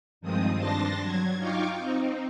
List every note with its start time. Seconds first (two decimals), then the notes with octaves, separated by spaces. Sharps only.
0.21 G2 D#3 F3 G#3 C4 D#6
0.55 G2 D4 A5 C6 A6 A#6
1.01 F#3 G#6
1.38 D#4 F4 F5 G5 C#6 D6
1.77 C4 D#4